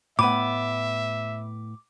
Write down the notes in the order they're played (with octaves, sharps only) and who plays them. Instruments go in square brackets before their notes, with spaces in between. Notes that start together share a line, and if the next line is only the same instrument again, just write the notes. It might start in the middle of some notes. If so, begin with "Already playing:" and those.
[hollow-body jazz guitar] A2 B3 [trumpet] E5 [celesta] B5 D#7 [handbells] D6